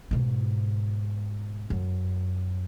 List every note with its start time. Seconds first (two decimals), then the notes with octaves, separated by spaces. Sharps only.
0.11 G#2 B2
1.70 F#2